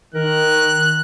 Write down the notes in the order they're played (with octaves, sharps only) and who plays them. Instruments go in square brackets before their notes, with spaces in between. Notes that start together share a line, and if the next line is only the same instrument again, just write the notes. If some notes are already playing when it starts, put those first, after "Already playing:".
[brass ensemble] D#3 [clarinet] A#4 [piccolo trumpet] F#6